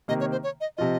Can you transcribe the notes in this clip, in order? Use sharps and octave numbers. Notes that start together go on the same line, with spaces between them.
C3 D#3 A#3 D#5
C#5
C5
C#5
D#5
C3 F3 C4 F4 D#5